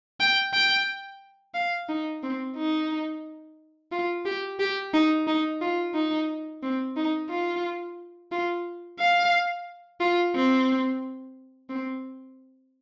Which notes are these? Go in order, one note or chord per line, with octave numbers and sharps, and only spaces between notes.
G5
G5
F5
D#4
C4
D#4
F4
G4
G4
D#4
D#4
F4
D#4
C4
D#4
F4
F4
F5
F4
C4
C4